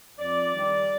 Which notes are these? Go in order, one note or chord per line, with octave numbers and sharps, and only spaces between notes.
F2 D5
D#3 G3